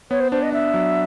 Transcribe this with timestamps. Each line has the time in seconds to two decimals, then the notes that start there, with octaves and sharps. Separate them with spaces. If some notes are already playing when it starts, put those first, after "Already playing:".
0.11 B3 C#5
0.20 C5
0.32 D4 C5
0.43 D#5
0.52 D4 E5
0.74 F#3